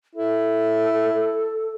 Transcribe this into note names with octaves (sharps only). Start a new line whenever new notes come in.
E4 A4